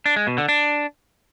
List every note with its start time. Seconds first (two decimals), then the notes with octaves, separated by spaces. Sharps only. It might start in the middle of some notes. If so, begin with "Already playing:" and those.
0.06 D4
0.16 G#3
0.27 B2
0.38 D3
0.49 D4